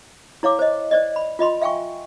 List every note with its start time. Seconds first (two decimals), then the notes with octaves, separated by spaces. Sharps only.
0.43 E4 C#5 F5 D6
0.59 C5 D#5
0.91 C5 D5 D#5
1.16 B5
1.39 F4 D#5 B5 C6
1.61 E5 F5 G5 G#5 C#6